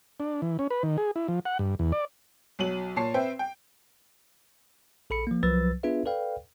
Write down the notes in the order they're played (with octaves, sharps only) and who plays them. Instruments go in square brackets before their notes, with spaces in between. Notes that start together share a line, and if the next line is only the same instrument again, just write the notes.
[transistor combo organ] D4
E3
C#4
B4
D#3
G#4
E4
F3
F#5
G2
E2
D5
[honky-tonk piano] B1 F#3 D#7 F#7
A#2 C#5 A5 C7
C4 B4 C5 E5 G5
G5
[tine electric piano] A#1 A4 B5 C#7
F3 A#3
C2 F3 F#3 B4 E6 A6
B3 D4 F4 G#4 B4 E5
A4 B4 D5 F5 G5